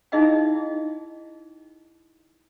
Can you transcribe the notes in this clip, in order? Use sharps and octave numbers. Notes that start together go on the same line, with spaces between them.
D#4 E4 G#4 D#5 F5 G5